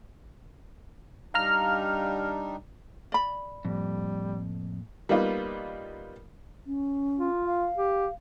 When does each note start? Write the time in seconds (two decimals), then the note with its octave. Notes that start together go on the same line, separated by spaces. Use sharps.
1.34 G3 D4 D#4 F5 A#5 F6
3.12 D5 B5
3.65 F2 A2 G3 A#3
5.09 G3 A#3 B3 D#4 F4
6.67 C#4
7.18 F4
7.45 F5
7.78 G4